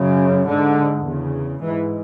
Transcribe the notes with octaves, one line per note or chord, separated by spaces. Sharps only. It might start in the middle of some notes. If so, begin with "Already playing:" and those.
Already playing: F#2 C#3
G#2 D3
E2 C#3
G#2 E3